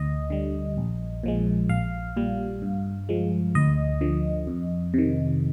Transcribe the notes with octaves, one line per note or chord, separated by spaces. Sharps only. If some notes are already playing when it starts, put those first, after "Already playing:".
Already playing: D2 D#5
D3 G3
A#1
A#2 F3 G#3
A#1 F5
A#2 G3
G2
F3 G#3
D2 D#5
D3 F3
F2
C3 D#3